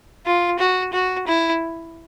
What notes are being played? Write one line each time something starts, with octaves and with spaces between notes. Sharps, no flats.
F4
F#4
F#4
E4